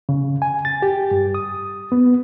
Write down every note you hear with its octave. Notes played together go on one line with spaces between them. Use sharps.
C#3
G#5
A6
G4
G2
D#6
B3